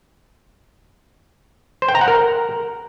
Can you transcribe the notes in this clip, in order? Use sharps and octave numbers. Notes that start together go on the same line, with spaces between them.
C5
G5
A#5
F#5
A#4